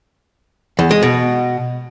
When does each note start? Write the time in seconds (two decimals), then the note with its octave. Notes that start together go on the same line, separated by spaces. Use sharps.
0.79 E2
0.91 G#3
1.03 B2